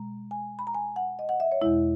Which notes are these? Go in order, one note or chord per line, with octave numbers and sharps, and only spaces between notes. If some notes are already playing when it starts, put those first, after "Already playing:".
Already playing: B2 G#3 A#5
G#5
B5
A#5
G#5
F#5
D#5
F#5
E5
C#5
E2 B2 G#3 E4